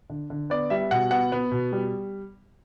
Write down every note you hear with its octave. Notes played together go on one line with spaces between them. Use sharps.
D3
D3
B3 D5
G3 E5
B2 F#5
B3 F#5
B3
B2
G3